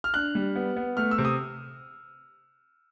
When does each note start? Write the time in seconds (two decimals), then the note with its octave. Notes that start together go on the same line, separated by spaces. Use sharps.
0.04 F6
0.14 D4 F#6
0.35 G3
0.56 B3
0.76 B3
0.97 A3 F6
1.11 E6
1.18 C3
1.25 D#6